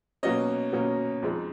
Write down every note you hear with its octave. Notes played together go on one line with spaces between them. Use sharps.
B2 F#3 A#3 C#4 D#5
B2 F#3 A#3 C#4
F2 F3 G#3 D#4